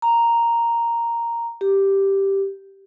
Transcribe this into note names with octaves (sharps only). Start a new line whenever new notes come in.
A#5
G4